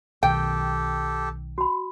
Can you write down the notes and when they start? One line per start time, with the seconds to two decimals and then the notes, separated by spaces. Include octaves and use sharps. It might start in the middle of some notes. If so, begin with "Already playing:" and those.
0.23 B1 B2 D#3 G4 A4 G5
1.58 F#4 B5